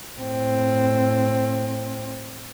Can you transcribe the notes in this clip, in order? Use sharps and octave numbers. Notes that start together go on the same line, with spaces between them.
A2 C4